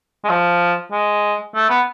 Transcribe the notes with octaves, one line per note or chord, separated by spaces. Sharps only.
G#3
F3
G#3
A3
B3